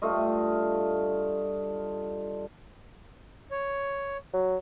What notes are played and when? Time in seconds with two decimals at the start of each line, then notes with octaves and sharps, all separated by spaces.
0.02 G2 A3 F4 D#5
3.51 C#5
4.33 F#3